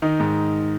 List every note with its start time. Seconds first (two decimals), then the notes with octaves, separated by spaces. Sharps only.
0.02 D#3 D#4
0.20 G#2